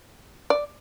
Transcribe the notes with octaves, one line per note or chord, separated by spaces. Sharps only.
D5